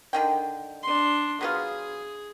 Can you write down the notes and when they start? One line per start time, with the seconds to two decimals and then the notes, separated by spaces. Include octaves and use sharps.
0.13 D3 D#3 G5
0.83 D4 C6
1.41 F#3 B3 F4 G#4